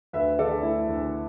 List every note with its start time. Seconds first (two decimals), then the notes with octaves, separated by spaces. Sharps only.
0.13 D2 B4 E5
0.39 D3 A4 D5
0.63 A3 E4
0.88 D2